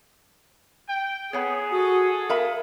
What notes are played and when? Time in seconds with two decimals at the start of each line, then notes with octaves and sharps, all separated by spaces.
0.88 G5
1.33 B3 G#4 C#5 F#5 B5
1.71 F#4 A4 D#6
2.29 A#4 E5 F5 B5